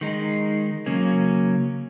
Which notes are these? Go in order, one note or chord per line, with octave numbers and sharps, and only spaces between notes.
D#3 G#3 D#4
C#3 F#3 A#3 C#4